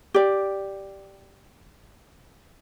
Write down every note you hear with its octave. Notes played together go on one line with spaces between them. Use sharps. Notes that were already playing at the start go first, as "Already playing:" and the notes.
G4 D5